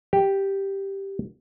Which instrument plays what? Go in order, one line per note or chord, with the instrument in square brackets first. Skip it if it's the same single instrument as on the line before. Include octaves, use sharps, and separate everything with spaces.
[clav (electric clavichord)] G4